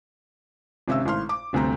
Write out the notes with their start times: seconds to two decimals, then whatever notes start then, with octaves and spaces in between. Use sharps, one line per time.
0.88 G#1 C3 C#4 E5 E6
1.05 G#1 A2 C6 F6
1.29 D6
1.53 G1 D2 C3 C4 A#5